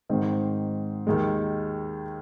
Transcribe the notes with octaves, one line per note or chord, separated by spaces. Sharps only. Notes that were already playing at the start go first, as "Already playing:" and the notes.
G#2 D#3 C4
D#2 D#3 G#3